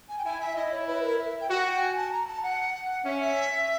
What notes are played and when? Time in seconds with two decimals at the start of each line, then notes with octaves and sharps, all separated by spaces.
0.09 G#5
0.19 G5
0.25 E4 G#5
0.40 E5
0.56 E4 D#5
0.72 C#5
0.87 B4
1.02 A#4
1.18 E5
1.41 G5
1.50 F#4 F#5
1.65 G5
1.81 G#5
1.96 A5
2.12 A#5
2.27 A5
2.43 F#5
3.05 C#4 E5
3.21 E5